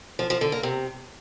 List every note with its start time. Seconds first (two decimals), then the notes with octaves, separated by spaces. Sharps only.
0.19 F3
0.30 F3
0.41 D3
0.52 A#3
0.63 C3